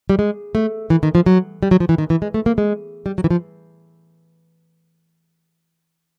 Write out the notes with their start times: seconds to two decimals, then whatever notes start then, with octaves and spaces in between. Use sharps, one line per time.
0.10 G3
0.19 G#3
0.55 A3
0.90 E3
1.03 D#3
1.15 F3
1.26 F#3
1.63 G3
1.71 F#3
1.80 F3
1.89 E3
1.98 D#3
2.10 E3
2.22 G#3
2.34 A3
2.46 A#3
2.58 G#3
3.06 G3
3.18 F#3
3.24 E3
3.30 F3